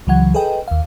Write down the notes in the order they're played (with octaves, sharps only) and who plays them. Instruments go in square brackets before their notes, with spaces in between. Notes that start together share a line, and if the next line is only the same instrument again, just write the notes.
[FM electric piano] C#2 C#3 E3 F#3 F#5 G#6
G#4 A4 B4 D#5 G5
D#2 F5